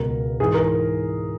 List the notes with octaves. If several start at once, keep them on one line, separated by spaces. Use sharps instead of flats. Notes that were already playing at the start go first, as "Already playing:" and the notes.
Already playing: C#2 B2 A#4
G#2 E3 G#4
A#4